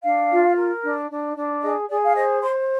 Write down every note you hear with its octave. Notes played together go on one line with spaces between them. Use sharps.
D4 F5
F4
A#4
D4
D4
D4
G#4 D#5
G#4 D5
F5
C5 D#5
C5 C6